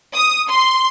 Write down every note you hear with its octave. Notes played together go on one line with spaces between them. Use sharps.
D#6
C6